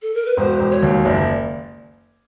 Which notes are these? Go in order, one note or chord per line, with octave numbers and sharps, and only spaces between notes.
A4
A#4
B4
E1 C5
E1
C#5
D#2
F#1 D5